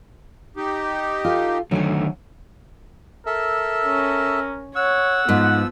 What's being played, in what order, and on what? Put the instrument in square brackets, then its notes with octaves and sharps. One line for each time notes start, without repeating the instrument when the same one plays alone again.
[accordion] D#4 G4
[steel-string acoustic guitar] F4 A4
[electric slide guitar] D3 D#3 A3 [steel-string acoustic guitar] F#3 F#5 G#5
[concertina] A4 E5 [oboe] A#4
[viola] C#4
[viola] C#5 [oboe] F#5 [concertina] E6
[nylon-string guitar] G#2 [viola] F3 B3